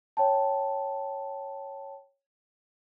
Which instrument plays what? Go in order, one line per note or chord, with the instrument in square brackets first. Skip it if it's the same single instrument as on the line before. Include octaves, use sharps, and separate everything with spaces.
[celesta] C#5 G5 A5